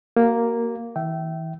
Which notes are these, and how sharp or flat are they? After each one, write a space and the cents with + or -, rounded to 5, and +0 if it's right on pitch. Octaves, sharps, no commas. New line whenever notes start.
A#3 +0 F#4 +40
E3 -35 E5 +0 G5 -25